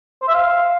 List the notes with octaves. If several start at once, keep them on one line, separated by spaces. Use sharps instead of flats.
C5
E5
F5